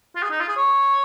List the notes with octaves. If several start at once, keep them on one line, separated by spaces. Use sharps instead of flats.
F4
G#4
D#4
F4
G#4
C#5